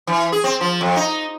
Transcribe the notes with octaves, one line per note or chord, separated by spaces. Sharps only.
E3
G#4
C4
F3
F2
D#4